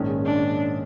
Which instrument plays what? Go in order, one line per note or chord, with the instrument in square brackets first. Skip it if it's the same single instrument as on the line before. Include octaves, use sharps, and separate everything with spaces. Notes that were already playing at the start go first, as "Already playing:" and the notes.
Already playing: [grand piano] A#1 G#2 D#3 G#3 C#4
[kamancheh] D4